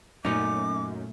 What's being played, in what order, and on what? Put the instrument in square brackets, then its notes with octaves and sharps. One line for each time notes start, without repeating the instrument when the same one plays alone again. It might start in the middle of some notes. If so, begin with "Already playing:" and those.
[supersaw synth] F#2 [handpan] A#2 A3 [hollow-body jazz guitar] C#4 D#4 [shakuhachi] D6